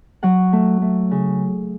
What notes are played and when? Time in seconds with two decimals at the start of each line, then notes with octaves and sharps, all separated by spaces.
0.23 F#3 F#5
0.53 A3
0.82 A3
1.11 C#3